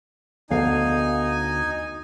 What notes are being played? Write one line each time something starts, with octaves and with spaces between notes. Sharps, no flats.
D2 B3 D#4 F5 G#5